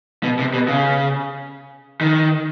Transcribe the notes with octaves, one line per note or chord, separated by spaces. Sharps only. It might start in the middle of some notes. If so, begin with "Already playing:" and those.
B2
C3
B2
C#3
D#3